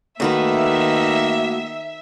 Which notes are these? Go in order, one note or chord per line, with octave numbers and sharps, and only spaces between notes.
D#3 A3 A#3 F#4 B4 E5